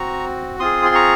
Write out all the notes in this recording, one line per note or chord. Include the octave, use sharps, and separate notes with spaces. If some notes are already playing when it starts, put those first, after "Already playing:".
Already playing: C4 F#4 A#5 C#6
C4 F4 G#4 C6 D#6
C6
A#5 C#6